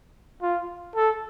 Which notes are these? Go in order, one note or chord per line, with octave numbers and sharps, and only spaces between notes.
F4
A4